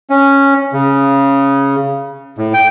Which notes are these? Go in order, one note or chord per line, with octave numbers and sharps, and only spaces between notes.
C#4
C#3
A2
G5